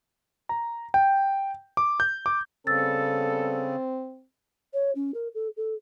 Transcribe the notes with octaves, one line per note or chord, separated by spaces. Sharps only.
A#5
G5
D6
G6
D6
C#3 G3 B3 C4 A4 E6 A6
C#5
C#4
A#4
A4
A4